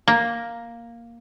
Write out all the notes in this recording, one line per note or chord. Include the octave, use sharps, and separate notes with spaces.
A#3